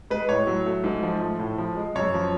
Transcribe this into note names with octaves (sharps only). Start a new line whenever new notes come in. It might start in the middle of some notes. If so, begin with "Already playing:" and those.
G#3 B4
A2 C#5
F#3
A3
G#2
F3
A3
A2
F3
G#3
F#2 C#5
F3